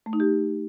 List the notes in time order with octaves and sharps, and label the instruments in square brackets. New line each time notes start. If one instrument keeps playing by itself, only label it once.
[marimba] A3
D#4
G4